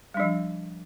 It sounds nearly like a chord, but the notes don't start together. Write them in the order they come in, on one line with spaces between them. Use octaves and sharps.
G3 D4 F3